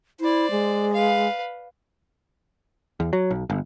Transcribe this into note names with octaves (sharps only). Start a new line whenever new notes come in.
E4 C5 D5
G#3
B4 F5
E2
F#3
B1
G1